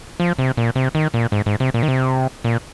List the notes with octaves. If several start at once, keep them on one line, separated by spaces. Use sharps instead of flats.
F3
C3
A#2
C3
D#3
A#2
G#2
G#2
C3
A#2
D#3
C3
A#2